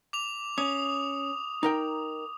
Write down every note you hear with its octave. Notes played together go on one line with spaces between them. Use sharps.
D6 F7
C#4 D#6
D#4 A#4 G5